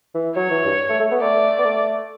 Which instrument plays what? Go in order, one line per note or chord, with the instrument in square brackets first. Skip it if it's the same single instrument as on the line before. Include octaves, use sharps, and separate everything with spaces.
[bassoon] E3
[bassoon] F#3 [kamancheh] C#5
[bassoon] E3
G2
A3
A3
B3
[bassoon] A3 [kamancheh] D5
[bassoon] B3
A3